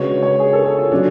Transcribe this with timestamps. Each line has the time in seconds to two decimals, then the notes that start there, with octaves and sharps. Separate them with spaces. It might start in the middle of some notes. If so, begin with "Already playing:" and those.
Already playing: C#3 G#3 D4 F#4 B4 C#5
0.23 C#5
0.40 G#4
0.53 A4
0.65 C#5
0.79 F4
0.92 C#3 F#3 C#4 D4